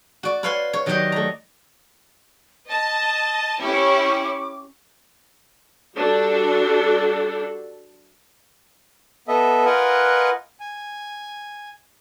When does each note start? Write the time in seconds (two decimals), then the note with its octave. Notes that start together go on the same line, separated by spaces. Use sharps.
0.23 F#4 D5
0.43 B4 C#5 F5 F#5 G#5 C6
0.73 C#5
0.86 D#3 F#3 G4 D5 D#5 G5
1.12 A3 A#5
2.70 D#5 A5 A6
3.61 C#4 E4 G4 D6
5.96 G3 D4 F#4 A4 D5
9.28 B3 A4 D#5 E5
9.65 F4 A#4 B4 D#5 F#5 G#5
10.60 G#5